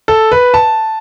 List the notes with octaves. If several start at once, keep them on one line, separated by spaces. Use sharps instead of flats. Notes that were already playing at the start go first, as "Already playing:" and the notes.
A4
B4
A5